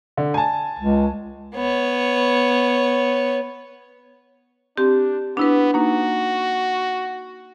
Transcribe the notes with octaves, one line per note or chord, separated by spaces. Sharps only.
D3
G#5 A5
C#2
B3 C#5
C4 D4 G4
B3 D4 E4 B4
A#3 D#4 F#4